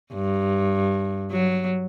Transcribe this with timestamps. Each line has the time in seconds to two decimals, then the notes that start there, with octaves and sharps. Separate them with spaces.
0.14 G2
1.32 F#3